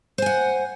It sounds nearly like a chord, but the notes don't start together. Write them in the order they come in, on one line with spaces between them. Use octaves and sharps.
C5 G#5 F#5